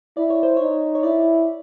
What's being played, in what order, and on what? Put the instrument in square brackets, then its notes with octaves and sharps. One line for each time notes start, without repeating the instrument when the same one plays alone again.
[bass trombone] E4 [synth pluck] D5
[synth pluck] C#5
C5
[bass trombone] D#4 [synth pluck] C#5
[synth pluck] C#5
[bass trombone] E4 [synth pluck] D5